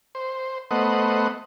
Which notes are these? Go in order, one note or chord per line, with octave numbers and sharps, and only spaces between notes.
C5
A3 B3 C5 D#5 F#5